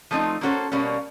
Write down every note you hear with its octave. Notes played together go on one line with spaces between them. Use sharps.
F3 A3 C4 D#4
A#3 C#4 F#4 A4 C5
B2 G3 A#3 C#4